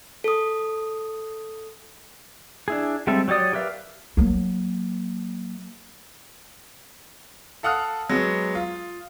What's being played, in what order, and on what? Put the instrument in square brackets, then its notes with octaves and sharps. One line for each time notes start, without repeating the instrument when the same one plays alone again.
[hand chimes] A4 D#6
[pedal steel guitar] D4 E4 G#4
G3 G#3 C4 A4 E5
F#3 G4 C#5 D5 D#6
G4 A#4 B4 E5 F5
[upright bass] F#3 A#3
[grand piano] A4 F5 F#5 D#6 F6 F#6
F#3 G#3 B3
F4